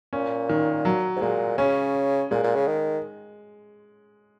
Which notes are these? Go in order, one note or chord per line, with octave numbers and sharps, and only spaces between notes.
A#2 C#4
D#3
F#3
G#2
A#2 G#3
C#3 C#4
A#2 G#3
A#2
C#3
D#3